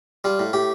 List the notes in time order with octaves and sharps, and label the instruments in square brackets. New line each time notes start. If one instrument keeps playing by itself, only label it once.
[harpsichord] G3 F4
A2
A2 G4